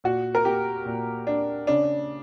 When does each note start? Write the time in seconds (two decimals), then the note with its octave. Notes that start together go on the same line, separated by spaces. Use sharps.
0.04 A#2 F#4
0.35 A#4
0.45 A#3 G4
0.86 A#2
1.27 A#3 D4
1.67 C#3 D4